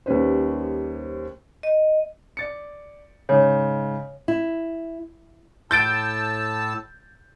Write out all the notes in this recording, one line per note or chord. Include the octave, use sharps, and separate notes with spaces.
D#2 G3 C#4 B4 C5
D#5
D5 A6 C#7
G#2 C#3 C#5
E4
A2 A5 E6 G6 A6 D7